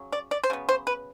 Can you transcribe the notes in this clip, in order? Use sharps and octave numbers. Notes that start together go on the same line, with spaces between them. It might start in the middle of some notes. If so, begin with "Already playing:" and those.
Already playing: C#3 F#3
D5
D5
C5
C#3 F#3 B3
C5
B4